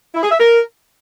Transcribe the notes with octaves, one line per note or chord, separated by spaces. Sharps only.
E4
G#4
E5
A#4